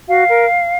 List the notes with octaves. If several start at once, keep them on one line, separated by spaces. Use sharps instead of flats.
F#4 F5
A#4